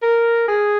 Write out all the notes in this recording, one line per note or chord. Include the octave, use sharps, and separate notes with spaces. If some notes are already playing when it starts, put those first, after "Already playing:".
A#4
G#4